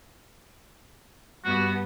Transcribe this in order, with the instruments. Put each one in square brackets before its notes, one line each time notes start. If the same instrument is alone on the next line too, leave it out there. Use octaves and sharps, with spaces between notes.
[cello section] G2 B3 [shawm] F#4